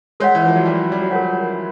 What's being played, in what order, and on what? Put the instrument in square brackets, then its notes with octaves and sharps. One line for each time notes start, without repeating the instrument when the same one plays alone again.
[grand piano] G#3 [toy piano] A#4 C#5 F#5
[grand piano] E3
F3
F#3
G3
G3
F#3
[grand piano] F3 [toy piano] A#4 C#5 F#5